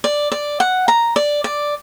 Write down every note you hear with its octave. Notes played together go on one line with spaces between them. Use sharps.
D5
D5
F#5
A#5
D5
D5